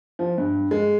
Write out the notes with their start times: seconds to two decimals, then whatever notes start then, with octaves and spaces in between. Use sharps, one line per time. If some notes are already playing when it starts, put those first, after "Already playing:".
0.19 F3
0.38 G2
0.71 G#3